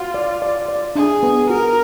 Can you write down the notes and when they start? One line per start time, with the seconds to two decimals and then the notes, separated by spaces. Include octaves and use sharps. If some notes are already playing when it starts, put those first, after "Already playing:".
Already playing: F4 F#4
0.14 D5
0.42 D5
0.69 D5
0.95 D4 G#4
1.23 B3
1.50 F#4 A#4